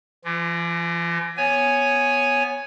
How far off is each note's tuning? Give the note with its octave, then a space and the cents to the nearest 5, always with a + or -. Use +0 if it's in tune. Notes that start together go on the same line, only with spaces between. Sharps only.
E3 +45 F4 -15
B3 +0 C#5 +0 G#5 +0